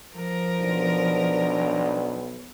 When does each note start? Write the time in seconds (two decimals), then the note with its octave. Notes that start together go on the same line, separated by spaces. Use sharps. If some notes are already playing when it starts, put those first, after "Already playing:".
0.17 F3 A#4
0.60 B1 D4